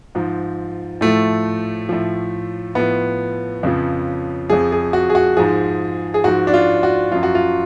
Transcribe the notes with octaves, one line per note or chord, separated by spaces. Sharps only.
G#2 F3
A2 F3 A3
A2 F3
A2 F3 B3
F2 C#3 F3
F2 F3 G#4
G#4
F#4
G#4
F#4
G#2 F3 G#4
G#4
G#2 F3 F#4
D4
F4
F#4
F#2 F3 F4
F#4
F4